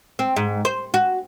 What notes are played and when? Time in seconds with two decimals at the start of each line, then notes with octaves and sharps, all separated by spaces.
0.19 C4
0.36 G#2
0.65 C5
0.94 F#4